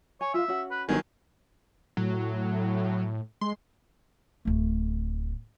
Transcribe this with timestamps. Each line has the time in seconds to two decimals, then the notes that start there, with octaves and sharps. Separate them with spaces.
0.21 C#5 G#5
0.34 F4 E5 F5
0.48 C#4 F#4 F#5
0.71 B4
0.89 G1 D#3 F#3 G#5
1.97 A2 F#3
3.41 G#3 C6
4.45 D1 A3